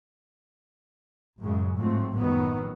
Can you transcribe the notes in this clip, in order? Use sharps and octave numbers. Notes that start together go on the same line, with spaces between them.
A1 F#2 C#3 F#3 G#3
G#2 F3 F#3 A3 C4
A#1 F#2 A2 D#3 F#3 B3